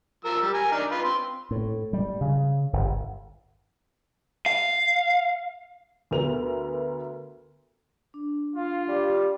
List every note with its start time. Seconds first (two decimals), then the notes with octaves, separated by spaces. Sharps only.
0.25 F3 A#4 E6
0.42 G3
0.54 A#4 G#5 A#5
0.72 D4 D#4 F6
0.91 F4 B4
1.04 C4 C6
1.51 A2
1.93 G3
2.21 C#3
2.73 G1
4.46 F5
6.11 D2 B3 A#4 F7
8.14 D4
8.56 F4 F5
8.88 G3 G4